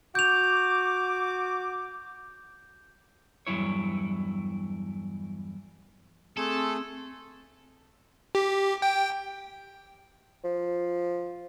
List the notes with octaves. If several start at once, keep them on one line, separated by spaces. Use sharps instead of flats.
F#4 D6 G6 F7
E2 G2 B2 F#3 E4 C#5
A3 C4 G#4 A4 C6 E6
G4
G5
F3